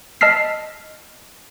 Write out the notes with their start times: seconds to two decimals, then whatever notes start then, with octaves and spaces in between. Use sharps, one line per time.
0.21 D#5 A5 E6 F6 B6 C7